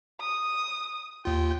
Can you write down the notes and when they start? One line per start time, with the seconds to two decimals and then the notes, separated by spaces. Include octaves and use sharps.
0.20 D#6
1.25 D#2 F4 G5